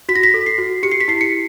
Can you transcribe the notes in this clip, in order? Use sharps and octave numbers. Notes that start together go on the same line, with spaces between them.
F#4 B6
A#6
B6
A4
C7
F#4
G4 C#7
C7
B6
E4 C7
C#7